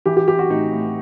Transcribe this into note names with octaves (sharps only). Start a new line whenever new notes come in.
E3 G4
G4
E3 G4
F#4
A2 D#4
A2